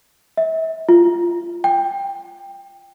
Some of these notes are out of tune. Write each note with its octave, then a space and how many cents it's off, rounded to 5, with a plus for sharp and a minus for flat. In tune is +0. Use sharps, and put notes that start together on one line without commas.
E5 -35
F4 -15
G5 +15